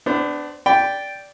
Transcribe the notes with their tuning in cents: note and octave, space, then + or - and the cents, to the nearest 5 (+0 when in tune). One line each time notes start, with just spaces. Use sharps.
B3 +35 D4 +0 C5 +0
D5 -10 G5 +0 B5 +0